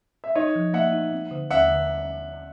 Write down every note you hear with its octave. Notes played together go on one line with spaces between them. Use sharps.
E5
D#4 C#5 D#5
F3
A#3 E5 F#5
D#4
C4
D3
D#2 E5 F#5
D3